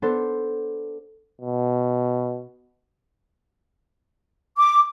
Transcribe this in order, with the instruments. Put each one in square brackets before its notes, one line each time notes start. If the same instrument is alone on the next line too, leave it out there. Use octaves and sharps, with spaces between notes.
[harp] B3 D4 A4 C5
[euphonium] B2
[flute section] D6